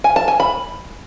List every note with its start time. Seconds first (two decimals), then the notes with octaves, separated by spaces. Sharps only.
0.04 G#5
0.16 A5
0.28 G#5
0.40 B5